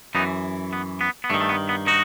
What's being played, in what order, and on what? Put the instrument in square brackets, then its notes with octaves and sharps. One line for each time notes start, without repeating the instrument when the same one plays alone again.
[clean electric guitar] F#2 E3 B3 D#4
B3
B3
B3
G2 D#3 A3
A3
B3
B3
D#4 F#4